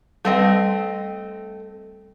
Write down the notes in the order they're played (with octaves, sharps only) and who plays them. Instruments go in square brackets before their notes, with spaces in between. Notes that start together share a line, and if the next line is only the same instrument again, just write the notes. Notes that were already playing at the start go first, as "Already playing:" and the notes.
[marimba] G3 B4 [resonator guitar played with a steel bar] A3 C4 D#5